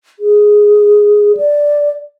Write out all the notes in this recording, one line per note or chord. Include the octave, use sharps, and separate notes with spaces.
G#4
D5